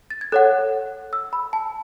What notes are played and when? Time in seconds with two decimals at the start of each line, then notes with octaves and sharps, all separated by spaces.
0.10 A6
0.21 G#6
0.32 A4 C#5 F#5 F#6
1.13 E6
1.33 B5
1.53 A5